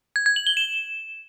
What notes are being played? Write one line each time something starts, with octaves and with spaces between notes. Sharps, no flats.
G#6
G#6
F#7
G7
E7